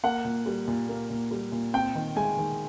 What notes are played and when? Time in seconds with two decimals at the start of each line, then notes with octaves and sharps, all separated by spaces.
0.03 A#3 F#5
0.25 A#2
0.46 G3
0.68 A#2
0.89 A#3
1.10 A#2
1.31 G3
1.52 A#2
1.73 C4 G5
1.95 D#3
2.16 G#3 G#5
2.37 D#3